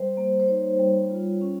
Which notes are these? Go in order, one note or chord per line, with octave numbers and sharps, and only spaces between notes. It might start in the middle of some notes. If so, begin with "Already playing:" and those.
Already playing: G3 C5
A#3
C5
D#4 C#5
G3
F4
C#4